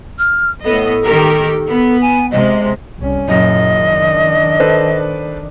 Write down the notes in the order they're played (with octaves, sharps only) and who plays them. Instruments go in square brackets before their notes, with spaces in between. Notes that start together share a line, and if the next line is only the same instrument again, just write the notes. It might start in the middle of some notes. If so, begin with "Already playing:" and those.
[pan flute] F6
[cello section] A2 B3 D#5 [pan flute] A4
[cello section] D#3 G4 A#4
B3
[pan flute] G#5
[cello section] C3 G#3 [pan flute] D#5
[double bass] C2 C#4
[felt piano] F#1 F#2 [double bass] A#2 [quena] D#5
[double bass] D#3 D4
[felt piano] A4 B4 C5